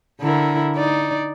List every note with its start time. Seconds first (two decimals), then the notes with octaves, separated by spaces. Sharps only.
0.21 D3 E4 A#4
0.76 D#4 D5